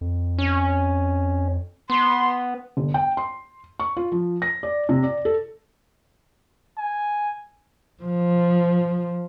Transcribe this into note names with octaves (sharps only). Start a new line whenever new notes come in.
F2
C#4
B3 C6
G1
G5
C6
C#6
F4
F3
A#6
D5
C3
D5
A4
G#5
F3